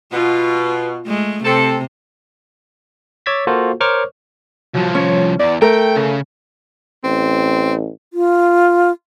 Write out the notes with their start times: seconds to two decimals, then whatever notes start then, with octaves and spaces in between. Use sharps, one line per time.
0.12 B2 F4
1.06 G#3 A3
1.44 C3 C4 A4
3.26 C#5 D6 E6 G#6 A6 B6
3.47 A#3 F4 F#4 A4 C5
3.80 A#4 C5 C#5 C#6 D6 F6
4.75 C2 F3 F#3
4.95 C#4 C#5
5.40 E2 D5
5.62 A3 A#4 G5
5.96 C#3
7.04 A1 C4
8.14 F4